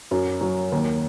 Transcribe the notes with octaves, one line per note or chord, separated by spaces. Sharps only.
F#2
F#3
D#2